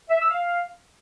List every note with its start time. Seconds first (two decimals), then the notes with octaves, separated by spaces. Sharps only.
0.10 E5
0.20 E6
0.30 F5